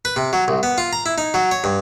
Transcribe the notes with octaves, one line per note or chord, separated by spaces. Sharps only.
B4
C3
F#3
C2
B3
F4
A#5
E4
D#4
F#3
C#5
G2